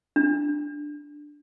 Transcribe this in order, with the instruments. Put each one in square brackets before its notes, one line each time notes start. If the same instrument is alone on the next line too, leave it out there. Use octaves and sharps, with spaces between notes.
[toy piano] D4